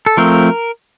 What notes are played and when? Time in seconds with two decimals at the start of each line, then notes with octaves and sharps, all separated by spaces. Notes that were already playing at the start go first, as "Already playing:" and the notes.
0.06 A4
0.17 F3 A3 C4 A#4